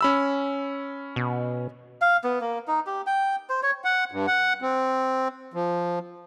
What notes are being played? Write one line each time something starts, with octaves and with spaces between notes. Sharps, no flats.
C#4 B5 E6
B2
F5
B3
A#3
D#4
G4
G5
C5
C#5
F#5
G2
F#5
C4
F3